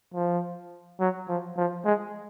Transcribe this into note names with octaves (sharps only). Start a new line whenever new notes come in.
F3
F#3
F3
F3
G#3